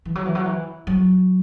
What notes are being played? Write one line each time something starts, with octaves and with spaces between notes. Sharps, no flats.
E3
F#3
E3
F#3
E3
F#3